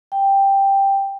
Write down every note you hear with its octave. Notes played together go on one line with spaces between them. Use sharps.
G5